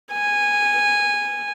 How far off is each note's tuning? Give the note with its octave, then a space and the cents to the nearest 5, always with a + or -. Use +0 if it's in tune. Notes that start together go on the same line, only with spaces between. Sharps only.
G#5 -15